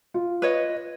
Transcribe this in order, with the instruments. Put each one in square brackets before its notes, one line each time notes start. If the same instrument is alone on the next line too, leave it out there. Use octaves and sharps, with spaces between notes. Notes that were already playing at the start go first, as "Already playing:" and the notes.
[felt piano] F4
[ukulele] B4 C#5 D#5